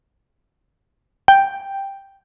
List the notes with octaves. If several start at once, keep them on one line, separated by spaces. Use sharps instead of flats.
G5